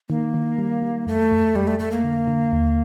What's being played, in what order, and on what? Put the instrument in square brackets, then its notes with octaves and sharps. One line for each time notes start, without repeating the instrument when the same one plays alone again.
[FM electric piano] D#3 [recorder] A#3
[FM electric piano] D#3
G3
G3
[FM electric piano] F2 [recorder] A3
[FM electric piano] F2
[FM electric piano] F2 [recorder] G3
[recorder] A3
[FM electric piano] F2 [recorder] A3
[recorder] A#3
[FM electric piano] D3
D3
D#2